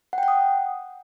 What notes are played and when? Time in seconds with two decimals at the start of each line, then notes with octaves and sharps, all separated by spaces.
0.13 F#5
0.18 G5
0.23 F#5
0.28 D#6